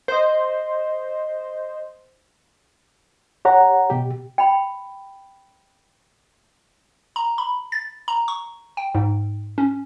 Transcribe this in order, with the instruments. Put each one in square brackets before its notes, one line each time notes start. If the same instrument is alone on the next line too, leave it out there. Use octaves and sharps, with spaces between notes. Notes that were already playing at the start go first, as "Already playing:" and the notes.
[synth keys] C5 D#5
[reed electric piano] G4 C#5 F#5 A#5
B2 G4
[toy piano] G5 B5
[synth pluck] A#5
B5
A6
A#5
C#6
G5
G#2
C#4